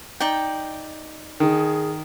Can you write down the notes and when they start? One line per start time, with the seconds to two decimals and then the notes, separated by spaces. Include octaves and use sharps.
0.20 D#4 D5 G5
1.40 D#3 G#4